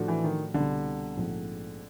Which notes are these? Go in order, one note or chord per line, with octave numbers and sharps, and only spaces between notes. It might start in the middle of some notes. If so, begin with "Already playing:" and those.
Already playing: A2 F3 A3 D4 F#4
E3
D#3
C2 B2 D3 G3 C4
A#1 G#2 F3 A3 C4